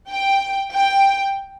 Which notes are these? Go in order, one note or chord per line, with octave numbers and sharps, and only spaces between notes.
G5
G5